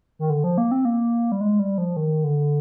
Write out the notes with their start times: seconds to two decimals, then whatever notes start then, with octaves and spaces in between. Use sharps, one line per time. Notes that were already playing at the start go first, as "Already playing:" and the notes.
0.19 D#3
0.30 D3
0.44 F3
0.58 A#3
0.71 C4
0.85 A#3
1.32 G3
1.41 G#3
1.59 G3
1.78 F3
1.97 D#3
2.24 D3